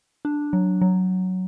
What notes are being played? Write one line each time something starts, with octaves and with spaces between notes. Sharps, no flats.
D4
F#3
F#3